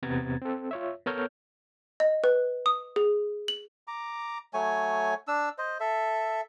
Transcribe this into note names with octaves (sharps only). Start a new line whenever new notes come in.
E2 C3 B3 A#5 G#6 A6
C4 A4
F4 C#5 E5
B3 A4 A#4 C#5 F6 G6
D#5
B4
D#6
G#4
F#7
A#5 D6
F#3 A3 C#5 G#5
D4 E6
C5 D#5
A4 E5